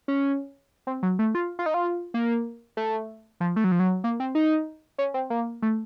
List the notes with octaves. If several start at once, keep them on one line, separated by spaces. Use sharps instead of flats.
C#4
C4
F#3
A3
F4
F4
D#4
F4
A#3
A3
F3
A3
F#3
F3
F#3
A#3
C4
D#4
C#4
C4
A#3
A3